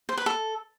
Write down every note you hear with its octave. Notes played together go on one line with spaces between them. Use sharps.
C5
B4
A4